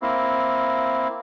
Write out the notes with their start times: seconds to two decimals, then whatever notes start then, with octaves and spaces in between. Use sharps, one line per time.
0.02 A#3 C4 E4